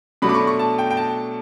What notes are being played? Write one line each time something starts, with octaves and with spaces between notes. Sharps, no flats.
B2 F#3 A3 D4 B5
D6
C#6
C#6
A5
G5
G5
A5